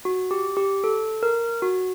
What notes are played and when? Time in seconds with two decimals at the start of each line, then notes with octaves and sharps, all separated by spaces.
0.05 F#4
0.31 G4
0.57 G4
0.84 A4
1.23 A#4
1.62 F#4